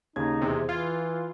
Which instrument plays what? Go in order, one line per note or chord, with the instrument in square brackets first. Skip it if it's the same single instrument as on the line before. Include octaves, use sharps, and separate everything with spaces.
[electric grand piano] D#2 C#3 G#6 [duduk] D#4
[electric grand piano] E2 G#4 [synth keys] C3
[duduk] E3 [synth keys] F4 [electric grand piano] G#6